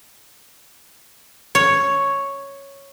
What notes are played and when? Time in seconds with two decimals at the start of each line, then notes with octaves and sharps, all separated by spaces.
1.55 C#5